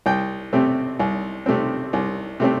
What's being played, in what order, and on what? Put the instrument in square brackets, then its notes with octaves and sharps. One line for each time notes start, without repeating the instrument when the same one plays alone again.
[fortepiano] C2 G5
C3 A3 C4
C2
C3 A3 C4
C2
C3 A3 C4